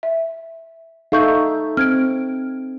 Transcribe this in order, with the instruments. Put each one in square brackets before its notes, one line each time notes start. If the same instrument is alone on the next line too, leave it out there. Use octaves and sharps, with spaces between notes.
[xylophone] E5
[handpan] D#4 A4 E5 [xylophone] F5 C#6 G6
[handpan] C4 [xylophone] F6 G#6 D7